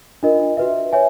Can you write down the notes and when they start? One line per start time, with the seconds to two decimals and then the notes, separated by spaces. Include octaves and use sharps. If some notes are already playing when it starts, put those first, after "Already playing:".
0.23 D4 F4 A#4 D#5
0.57 F#4 B4 E5
0.92 C#5 E5 G#5